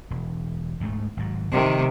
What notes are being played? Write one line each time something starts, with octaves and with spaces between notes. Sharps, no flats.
E1
D2 G#2 A3
G#1 G#2 F#3
F1 C3 D#3